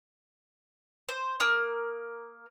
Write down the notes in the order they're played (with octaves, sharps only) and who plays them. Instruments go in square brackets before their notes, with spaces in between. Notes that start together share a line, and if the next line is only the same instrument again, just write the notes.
[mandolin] C5
A#3 A#4 D#6 F6